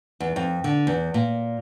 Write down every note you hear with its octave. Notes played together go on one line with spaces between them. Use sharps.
E2
F2
D3
E2
A#2